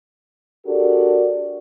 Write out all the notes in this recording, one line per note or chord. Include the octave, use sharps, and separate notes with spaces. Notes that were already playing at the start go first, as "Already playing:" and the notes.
D4 F#4 G4 A4 A#4 D5